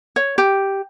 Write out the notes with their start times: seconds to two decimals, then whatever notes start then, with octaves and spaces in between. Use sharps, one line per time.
0.16 C#5
0.38 G4